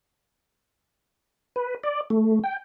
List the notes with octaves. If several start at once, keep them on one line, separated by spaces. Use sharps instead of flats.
B4
D5
A3
G5